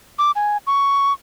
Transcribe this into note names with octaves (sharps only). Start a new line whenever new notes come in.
D6
G#5
C#6